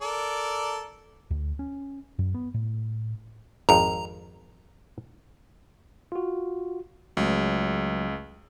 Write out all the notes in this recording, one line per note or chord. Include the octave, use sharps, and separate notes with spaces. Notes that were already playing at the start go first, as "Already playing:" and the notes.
A4 A#4 D5
D2
C#4
F#2
B3
A2
G#1 F2 A#5
F4 F#4
C#2 F#3 A3